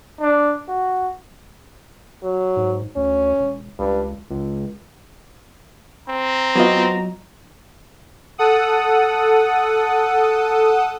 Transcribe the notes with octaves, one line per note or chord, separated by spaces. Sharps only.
D4
F#4
F#3
G#2
D2 C#4
E1
C#2 G2
C#2
C4 A#5
F#3 B3 F4 F#4 D#5
A4 F#5 D#6